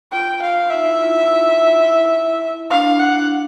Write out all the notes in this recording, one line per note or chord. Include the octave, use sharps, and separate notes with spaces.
F4 G5
F5
D#4 E5
E4
F4
E4
D4 F5
F#5